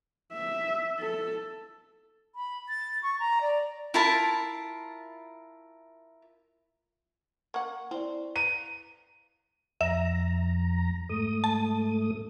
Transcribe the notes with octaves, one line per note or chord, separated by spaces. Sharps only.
E5
A4
B5
A6
C#6
A#5
D5
E4 F4 A#4 A5
A#3 F#5 C#6
C4 E4 C5 D5
B4 F5 A#5 D#7
F2 E5 A#5
G#2 A3 D#6
A5